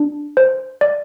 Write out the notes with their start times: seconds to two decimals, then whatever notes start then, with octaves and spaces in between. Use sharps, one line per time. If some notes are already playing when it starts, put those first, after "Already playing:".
Already playing: D4
0.37 C5
0.81 D5